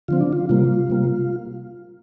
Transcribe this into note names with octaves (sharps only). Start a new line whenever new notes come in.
D3 F3 C4 F4
D4
F4
C3 G3 A#3 F4
C3 G3 A#3